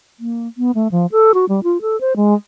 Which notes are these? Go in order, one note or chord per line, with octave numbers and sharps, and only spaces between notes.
A#3
B3
A3
F3
A4
F#4
G3
F4
A4
C5
G#3